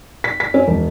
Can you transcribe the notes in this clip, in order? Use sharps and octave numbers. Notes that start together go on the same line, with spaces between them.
B6
B6
C#4
E1